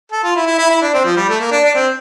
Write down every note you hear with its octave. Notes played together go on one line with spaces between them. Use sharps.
A4
F4
E4
E4
E4
E4
D4
C4
F3
G3
A3
A#3
D4
D4
C4